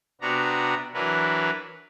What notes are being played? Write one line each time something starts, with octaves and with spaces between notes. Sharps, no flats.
C3 B3 D4 F#4 A#5
E3 F#3 D4 A#4 B4